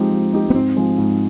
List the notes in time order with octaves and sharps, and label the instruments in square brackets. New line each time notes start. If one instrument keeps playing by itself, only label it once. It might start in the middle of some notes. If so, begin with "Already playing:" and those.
Already playing: [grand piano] F3 C4 D#4 G4 [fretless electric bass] G#3
[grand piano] F3
C4 D#4 G4
[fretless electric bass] B3
[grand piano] G#2 [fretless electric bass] C4
[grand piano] F3 G#3
G#2